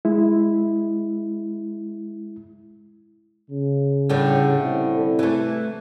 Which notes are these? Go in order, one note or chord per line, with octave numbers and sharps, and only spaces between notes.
G#3 E4
C#3
A2 D3 G3
C3 E4
E3 A3